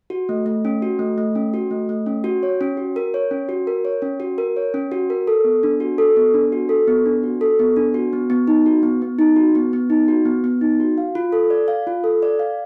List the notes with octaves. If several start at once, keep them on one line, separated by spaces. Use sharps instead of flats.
F#4
A3
A3
C#4
F#4
A3
A3
C#4
F#4
A3
A3
C#4
F#4
C#5
C#4
F#4
A#4
C#5
C#4
F#4
A#4
C#5
C#4
F#4
A#4
C#5
C#4
F#4
A#4
A4
B3
D4
F#4
A4
B3
D4
F#4
A4
B3
D4
F#4
A4
B3
D4
F#4
B3
B3
D#4
F#4
B3
B3
D#4
F#4
B3
B3
D#4
F#4
B3
B3
D#4
F#4
F5
F4
A4
D5
F5
F4
A4
D5
F5